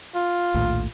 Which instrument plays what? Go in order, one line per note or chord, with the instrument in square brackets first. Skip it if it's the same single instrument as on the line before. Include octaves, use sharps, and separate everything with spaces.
[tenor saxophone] F4
[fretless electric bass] A#1 D#2 A2